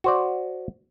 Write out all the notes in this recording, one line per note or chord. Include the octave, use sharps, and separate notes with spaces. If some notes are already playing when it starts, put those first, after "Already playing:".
F#4 C5 D5